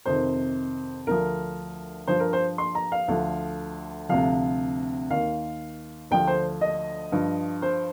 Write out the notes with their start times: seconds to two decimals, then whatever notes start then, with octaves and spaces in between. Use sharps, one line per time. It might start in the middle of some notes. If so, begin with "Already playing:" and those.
0.06 F2 C3 D#3 C5
1.07 D2 D3 F3 A#4
2.07 G2 F3 C5
2.20 A#4
2.33 C5
2.58 C6
2.75 A#5
2.92 F5
3.08 D2 D3 F3
4.09 D2 C3 F3 F5
5.10 D#2 D#3 F5
6.11 D2 D3 F3 G5
6.27 C5
6.61 D#5
7.12 G2 F3
7.62 C5